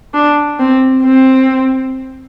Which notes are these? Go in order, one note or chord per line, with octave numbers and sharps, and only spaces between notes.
D4
C4
C4